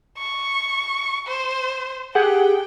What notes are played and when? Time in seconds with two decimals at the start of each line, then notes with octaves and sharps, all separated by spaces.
0.18 C#6
1.27 C5
2.15 G4 G#4 F#5 G5